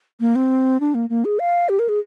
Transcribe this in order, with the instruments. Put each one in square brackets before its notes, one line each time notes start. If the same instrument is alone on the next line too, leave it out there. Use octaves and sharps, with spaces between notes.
[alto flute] A#3
C4
D4
A#3
A#3
G#4
F5
G4
A#4
G#4